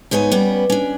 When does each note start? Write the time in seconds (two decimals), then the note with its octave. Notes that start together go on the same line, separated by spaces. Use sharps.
0.11 G#2 B3 D#4 C#5 G#5
0.32 G3 B3 C#4
0.70 C#4 D4